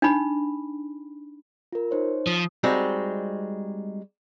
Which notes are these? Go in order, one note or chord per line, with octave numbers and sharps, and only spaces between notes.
D4 D#4 B5
F4 A#4
D#4 C5 C#5
F3 D#6
G3 G#3 C4 D#4 F#4